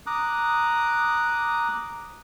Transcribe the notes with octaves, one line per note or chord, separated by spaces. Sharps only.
A#5 D6 D#6 F#6